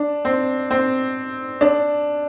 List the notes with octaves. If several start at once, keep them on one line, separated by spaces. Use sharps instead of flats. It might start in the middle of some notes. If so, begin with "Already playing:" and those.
Already playing: D4
C4
C4
D4